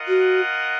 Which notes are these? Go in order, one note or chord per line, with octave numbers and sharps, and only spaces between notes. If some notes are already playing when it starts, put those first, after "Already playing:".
Already playing: F4 A#4 D#5 F#5
F#4